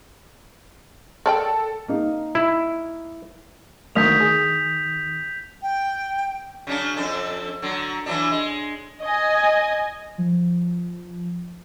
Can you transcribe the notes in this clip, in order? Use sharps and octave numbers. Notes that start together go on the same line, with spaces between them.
A4 A#4 D5 G5
A#3 D#4
E4
D2 D#3 A#3 D#6 G6 B6 F7
G#4
G5
C#3 F#3 D4
F2 D4 A4
D3 F#3
E3 F#3 D4
G#3
D#5 G#5
F3